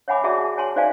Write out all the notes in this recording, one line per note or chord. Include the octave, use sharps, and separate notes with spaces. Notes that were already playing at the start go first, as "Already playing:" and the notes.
C#5 E5 F#5 G#5 B5 D6
F#4 G#4 D5 E5 A5
C#5 G#5 A5 C6
D#4 C5 D5 E5 F5 G#5